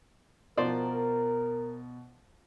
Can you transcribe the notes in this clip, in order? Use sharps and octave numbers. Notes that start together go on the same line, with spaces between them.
B2 F3 A#4 C5 D5